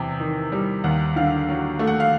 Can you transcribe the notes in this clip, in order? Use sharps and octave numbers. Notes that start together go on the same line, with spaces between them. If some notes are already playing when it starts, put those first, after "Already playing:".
Already playing: E2 C3 G5
D#3
G3
D#2 F#5
D3 F5
F#3
A3
F#5
F5